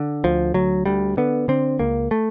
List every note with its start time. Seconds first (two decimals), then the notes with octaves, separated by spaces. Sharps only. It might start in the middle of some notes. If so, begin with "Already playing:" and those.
Already playing: D3
0.24 D2 F3
0.54 D2 F#3
0.86 D2 G3
1.17 D3 B3
1.48 D3 C4
1.79 C#2 A#3
2.11 A3